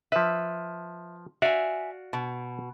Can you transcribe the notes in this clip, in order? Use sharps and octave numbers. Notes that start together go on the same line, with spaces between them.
F3 B4 E5
F#4 D5 E5 F5 G#5
B2